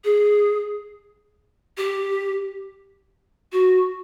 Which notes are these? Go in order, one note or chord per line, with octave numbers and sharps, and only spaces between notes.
G#4
G4
F#4